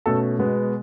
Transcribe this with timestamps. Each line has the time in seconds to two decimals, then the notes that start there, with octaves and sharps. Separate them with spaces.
0.06 B2 A3 C#4 A4
0.39 B2 G#3 B3